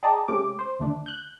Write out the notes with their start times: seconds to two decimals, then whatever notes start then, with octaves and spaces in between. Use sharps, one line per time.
0.03 G#4 D5 D#5 G5 A5 A#5
0.28 C3 G#3 A3 C#4 G4 D6
0.59 C5
0.79 D#2 D3 A3 D4
1.06 F#6 G6